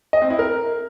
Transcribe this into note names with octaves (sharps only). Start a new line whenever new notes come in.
D#5
C4
E4
A#4